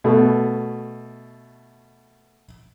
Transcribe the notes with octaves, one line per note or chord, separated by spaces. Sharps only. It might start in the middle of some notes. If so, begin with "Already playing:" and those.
B2 A3